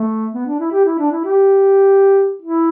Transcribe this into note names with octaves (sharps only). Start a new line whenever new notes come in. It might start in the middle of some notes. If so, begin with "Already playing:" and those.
Already playing: A3
B3
D4
E4
G4
E4
D4
E4
G4
E4